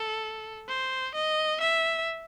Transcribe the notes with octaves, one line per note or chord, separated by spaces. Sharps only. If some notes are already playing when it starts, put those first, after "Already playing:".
Already playing: A4
C5
D#5
E5